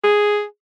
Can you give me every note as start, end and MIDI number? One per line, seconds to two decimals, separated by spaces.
0.04 0.43 68